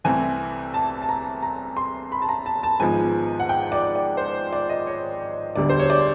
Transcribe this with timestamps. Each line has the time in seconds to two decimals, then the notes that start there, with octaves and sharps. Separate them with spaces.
0.04 C2 C3 E3 A3 C4 G#5
0.74 A5
1.02 A5
1.09 A#5
1.42 A#5
1.77 C6
2.12 B5
2.22 A5
2.29 A#5
2.46 A5
2.63 A5
2.80 G#1 G#2 F3 G#3 B3 G#5
3.40 F#5
3.49 G5
3.72 D5
3.95 D5
4.17 C5
4.52 D5
4.69 D#5
4.87 C#5
5.55 E1 D2 D3 G3 B3 D5
5.69 C5
5.80 C#5
5.90 D5